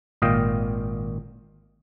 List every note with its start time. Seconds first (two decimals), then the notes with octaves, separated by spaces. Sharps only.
0.22 G#1 A#2 D#5 F5 G5